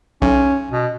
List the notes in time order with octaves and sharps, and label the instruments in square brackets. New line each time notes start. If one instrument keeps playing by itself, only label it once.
[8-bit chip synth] B1 [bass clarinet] C#4
[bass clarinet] B2